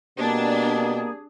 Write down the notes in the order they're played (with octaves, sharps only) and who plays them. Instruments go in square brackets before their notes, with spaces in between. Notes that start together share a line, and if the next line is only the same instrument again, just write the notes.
[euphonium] B2 [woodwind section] G3 C4 G#4 [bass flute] A#3 [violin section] D4